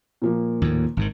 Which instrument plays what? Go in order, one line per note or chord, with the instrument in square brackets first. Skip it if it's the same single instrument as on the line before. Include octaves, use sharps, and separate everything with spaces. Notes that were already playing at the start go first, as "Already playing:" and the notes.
[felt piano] A#2 F3 A#3
[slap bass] D#2 A2
G#1 G#2 D#3